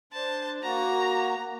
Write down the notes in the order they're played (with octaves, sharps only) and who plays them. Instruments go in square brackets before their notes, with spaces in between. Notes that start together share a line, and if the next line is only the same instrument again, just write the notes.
[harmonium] D4 [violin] C5 A5
[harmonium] A#3 F#4 [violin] A#5